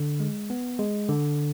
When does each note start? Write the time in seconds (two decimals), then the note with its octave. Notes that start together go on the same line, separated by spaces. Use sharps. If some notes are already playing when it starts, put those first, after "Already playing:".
Already playing: D3
0.20 G#3
0.50 B3
0.79 G#3
1.09 D3